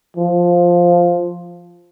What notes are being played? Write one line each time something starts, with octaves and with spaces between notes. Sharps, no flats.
F3